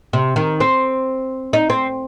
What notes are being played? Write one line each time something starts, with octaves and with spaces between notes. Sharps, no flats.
C3
D#3
C4
D#4
C4